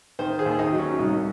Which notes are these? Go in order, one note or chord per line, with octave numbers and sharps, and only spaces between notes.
D#3 C5
G#4
D#2
D#4
F#3
C#4
C2 D#4